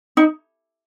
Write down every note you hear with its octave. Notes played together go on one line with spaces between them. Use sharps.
D#4